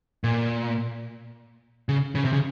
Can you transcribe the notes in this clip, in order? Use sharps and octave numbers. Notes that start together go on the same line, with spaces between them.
A#2
C#3
C#3
C3
C#3